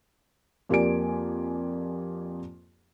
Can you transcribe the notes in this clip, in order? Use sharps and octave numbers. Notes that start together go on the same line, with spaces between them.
F2 A#3 G4 D5 G#5 D7